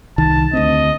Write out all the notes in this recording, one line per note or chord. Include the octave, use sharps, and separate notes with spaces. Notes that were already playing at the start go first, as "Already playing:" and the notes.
C2 D#3 A5
D2 B3 C4 D#5